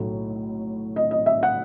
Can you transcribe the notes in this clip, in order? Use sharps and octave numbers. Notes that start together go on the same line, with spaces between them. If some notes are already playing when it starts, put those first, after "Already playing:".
Already playing: B1 A2 F#3 A3
D#5
D#5
E5
F#5